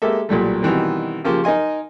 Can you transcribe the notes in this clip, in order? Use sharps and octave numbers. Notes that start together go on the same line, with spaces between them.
G#3 A#3 G4 A4 E5
B1 A#2 G3 A3
B2 D#3 E3 G3 C4
C#3 F3 A#3 G4
D#4 A#4 D#5 G#5 C6